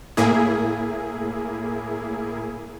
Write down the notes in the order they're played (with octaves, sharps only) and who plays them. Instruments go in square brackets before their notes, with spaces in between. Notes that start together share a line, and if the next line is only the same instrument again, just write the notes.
[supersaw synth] A2 A#3 E4 G#4